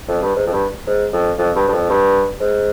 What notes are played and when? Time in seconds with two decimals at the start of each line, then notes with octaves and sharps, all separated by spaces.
0.08 F2
0.22 G2
0.36 G#2
0.46 F2
0.53 G2
0.87 G#2
1.13 F2
1.38 F2
1.55 G2
1.68 G2
1.73 F2
1.90 G2
2.40 G#2